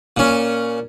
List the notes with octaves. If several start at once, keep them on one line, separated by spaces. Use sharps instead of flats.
A#2 C#4